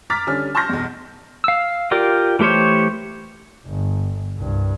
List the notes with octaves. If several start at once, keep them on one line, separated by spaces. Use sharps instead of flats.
A#5 D6 F6 A6 B6
D3 G3 C#4 F6
A5 C6 C#6 F6 G6 A#6
B1 E2
F5 E6
F4 G4 A#4 D5
E3 A3 G4 C5 C#5
G1
C2 G2